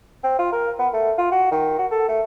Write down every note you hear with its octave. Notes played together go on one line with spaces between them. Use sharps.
C4
F4
A#4
B3
A3
F4
F#4
D#3
F#4
A4
A3